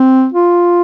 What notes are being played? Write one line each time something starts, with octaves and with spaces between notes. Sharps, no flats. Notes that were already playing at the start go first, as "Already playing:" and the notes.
Already playing: C4
F4